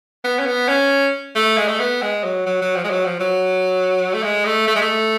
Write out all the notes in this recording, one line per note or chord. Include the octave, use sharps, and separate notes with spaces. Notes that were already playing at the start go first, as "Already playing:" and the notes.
B3
C#4
B3
C#4
A3
G#3
A3
B3
G#3
F#3
F#3
F#3
F3
G#3
F#3
F3
F#3
A3
G#3
A3
A3
G#3
A3